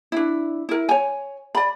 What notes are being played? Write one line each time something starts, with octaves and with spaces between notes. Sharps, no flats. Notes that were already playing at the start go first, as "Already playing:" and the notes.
D4 E4
E4 A#4
C#5 G#5
D5 B5